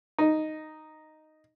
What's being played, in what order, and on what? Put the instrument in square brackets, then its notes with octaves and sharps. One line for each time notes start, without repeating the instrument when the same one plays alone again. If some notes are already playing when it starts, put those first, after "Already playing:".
[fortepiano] D#4